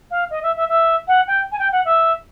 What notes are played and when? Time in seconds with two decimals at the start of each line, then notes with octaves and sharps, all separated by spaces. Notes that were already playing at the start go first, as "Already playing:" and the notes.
0.11 F5
0.30 D#5
0.43 E5
0.56 E5
0.68 E5
1.08 F#5
1.27 G5
1.52 G#5
1.59 G5
1.72 F#5
1.85 E5